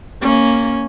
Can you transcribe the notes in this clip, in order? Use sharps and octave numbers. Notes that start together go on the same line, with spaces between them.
A#3 C#4